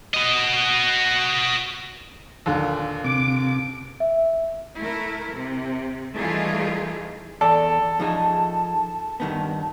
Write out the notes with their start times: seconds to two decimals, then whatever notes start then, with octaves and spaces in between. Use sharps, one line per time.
0.14 F#4 D#5
2.46 D#2 A#2 D3
3.04 C3 D6
4.00 E5
4.80 A3 E4 A#4
5.35 C3
6.17 E3 G3 A3 D#4 F4 G#4
7.41 E2 A4 D5 A5
8.00 F3 D#4 G#4
9.20 G2 D#3 B3